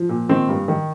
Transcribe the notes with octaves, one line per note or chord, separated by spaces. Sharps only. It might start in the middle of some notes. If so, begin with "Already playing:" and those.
Already playing: F3
A#2
D#3 C4
G2
D#3